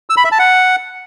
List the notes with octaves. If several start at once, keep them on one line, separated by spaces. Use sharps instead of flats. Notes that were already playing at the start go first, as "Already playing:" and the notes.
E6
B5
E5
A5
F#5